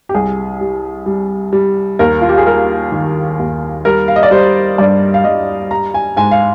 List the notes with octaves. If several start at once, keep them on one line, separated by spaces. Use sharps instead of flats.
G4
C2 G#4
G3
G3
G3
D#2 A#4
F4
G4
G#4
G3 A#4
D#3
D#2
G3 A#4
F5
D#5
D5
G3 C5
G2 D5
F5
G2 D#5
G3 A#5
G#5
G#2 G#5
F5